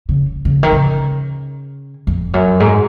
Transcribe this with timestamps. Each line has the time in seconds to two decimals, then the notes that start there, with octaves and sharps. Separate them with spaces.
0.09 C#3
0.45 C#3
0.63 D#3
0.72 C#3
2.07 F2
2.34 F#2
2.60 G#2